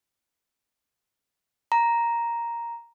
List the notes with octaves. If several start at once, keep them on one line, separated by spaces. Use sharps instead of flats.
A#5